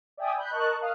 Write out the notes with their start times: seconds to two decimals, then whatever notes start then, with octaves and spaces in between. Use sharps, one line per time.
0.17 D5 E5 G5 G#5 D#6
0.37 B5 F#6 G6
0.51 A#4 D#5 A5 C#6 F#6
0.81 A#4 F5 D#6 F6 F#6